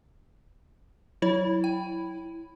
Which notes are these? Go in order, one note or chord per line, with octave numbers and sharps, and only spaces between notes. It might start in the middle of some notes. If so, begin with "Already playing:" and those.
F#3 E4 C#5
G5